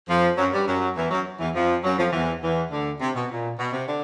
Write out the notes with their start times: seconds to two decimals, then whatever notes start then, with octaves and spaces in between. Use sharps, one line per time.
0.08 F2 F3
0.38 F#2 F#3
0.52 G2 G3
0.67 F#2 F#3
0.96 E2 E3
1.11 F#2 F#3
1.40 E2 E3
1.55 F2 F3
1.84 F#2 F#3
1.98 F2 F3
2.13 E2 E3
2.43 E2 E3
2.71 D2 D3
3.01 C3
3.15 B2
3.31 A#2
3.59 B2
3.73 C3
3.88 D3